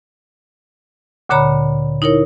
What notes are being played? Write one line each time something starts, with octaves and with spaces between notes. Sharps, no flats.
D2 A#2 D3 C#5 A#5 B5
D#4 E4 A#4 C#5